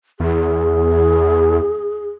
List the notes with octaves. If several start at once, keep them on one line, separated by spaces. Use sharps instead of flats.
E2 G#4